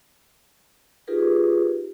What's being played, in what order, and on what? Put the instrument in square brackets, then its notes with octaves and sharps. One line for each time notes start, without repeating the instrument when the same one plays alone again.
[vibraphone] D#4 F4 G4 G#4 A#4 B4